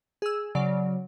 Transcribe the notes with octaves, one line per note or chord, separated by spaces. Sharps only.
G#4 E6
C#3 F#3 D5